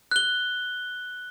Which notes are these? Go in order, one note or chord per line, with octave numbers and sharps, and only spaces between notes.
F#6 G7